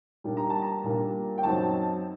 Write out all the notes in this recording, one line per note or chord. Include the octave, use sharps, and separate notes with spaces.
A#2 G3 A#3 D4
A#5
A5
A#5
A#2 G3 A#3 D4
G5
F#2 F#3 C4 D#4 A5